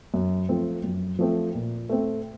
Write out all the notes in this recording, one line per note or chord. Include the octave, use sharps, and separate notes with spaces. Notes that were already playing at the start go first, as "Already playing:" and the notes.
F#2
F3 A3 C4
F#2
F3 A3 C4
A#2
A3 C4